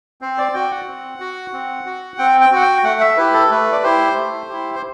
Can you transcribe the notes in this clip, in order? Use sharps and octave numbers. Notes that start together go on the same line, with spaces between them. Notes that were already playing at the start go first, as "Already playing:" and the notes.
C4 C5
D5
F#4 G5
F#5
C4
F#4
C4
F#4
C4 G5
G5
F#4 F#5
G5
A3 F#5
E5
E4 G4 B4
A4
A3 B4
D5
E4 G4 C5
A3
E4 G4
C5